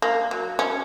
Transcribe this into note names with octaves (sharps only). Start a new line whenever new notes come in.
A#3
F#3
C#4